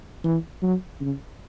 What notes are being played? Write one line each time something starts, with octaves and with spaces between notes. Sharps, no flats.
E3
F#3
C#3